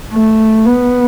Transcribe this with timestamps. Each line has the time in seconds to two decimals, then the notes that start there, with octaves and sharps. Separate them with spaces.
0.13 A3
0.66 B3